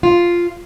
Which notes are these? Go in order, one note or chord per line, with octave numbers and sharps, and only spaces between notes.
F4